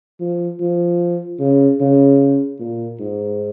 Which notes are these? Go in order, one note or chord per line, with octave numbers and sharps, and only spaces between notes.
F3
F3
C#3
C#3
A#2
G#2